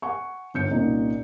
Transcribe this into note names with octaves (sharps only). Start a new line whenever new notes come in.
F#5 G#5 C#6
G1 G6 C#7
C2 A#2 C#4 D#4